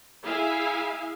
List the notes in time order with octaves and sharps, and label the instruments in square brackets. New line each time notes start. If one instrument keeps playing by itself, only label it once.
[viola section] E4 G#4 E5 F5 G#5